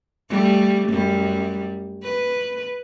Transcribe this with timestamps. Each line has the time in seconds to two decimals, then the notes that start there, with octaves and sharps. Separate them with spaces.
0.30 G3 A3
0.89 F#2 G3
2.03 B4